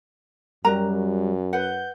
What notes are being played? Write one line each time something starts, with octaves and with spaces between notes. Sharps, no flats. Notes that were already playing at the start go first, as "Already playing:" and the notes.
F#2 G3 F#4 A#4 A#5
B4 F#5 G6